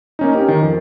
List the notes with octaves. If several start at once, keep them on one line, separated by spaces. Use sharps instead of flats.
A#3 C#4 D#4
C#4 D#4 G4 A#4
D#3
F2